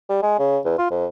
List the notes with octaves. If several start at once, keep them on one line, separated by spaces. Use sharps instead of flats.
G3
G#3
C#3
E2
F4
F2